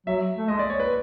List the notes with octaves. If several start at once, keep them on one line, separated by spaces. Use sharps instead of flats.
F#3 E5
A3
G#3 D#5
D5
C#5
B4